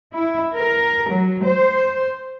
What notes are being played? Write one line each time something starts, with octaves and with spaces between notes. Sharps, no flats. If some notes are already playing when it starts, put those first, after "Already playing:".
E4
A#4
F#3
C5